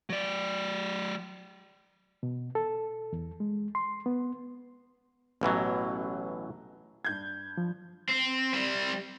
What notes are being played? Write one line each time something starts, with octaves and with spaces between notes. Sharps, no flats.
F#3 D5
B2
A4
E2
G#3
C6
B3
A1 B2 E3 F#3
G2 G6 G#6
F3
C4
G3 C4